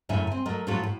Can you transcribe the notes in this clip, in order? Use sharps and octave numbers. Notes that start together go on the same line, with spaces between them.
F#2 A2 C#3 E5 G#5
C4 G#5
F#3 A3 A#4 D#5
A2 F3 F#3 F#4 A4
A2